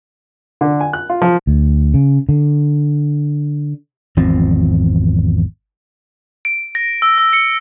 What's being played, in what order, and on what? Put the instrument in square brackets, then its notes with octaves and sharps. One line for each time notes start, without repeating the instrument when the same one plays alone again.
[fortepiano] D3
G#5
F#6
F4
F3
[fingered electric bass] D2
C#3
D3
[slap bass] G#1 E2 F3 C4
[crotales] D7
A#6
E6
E6
C#7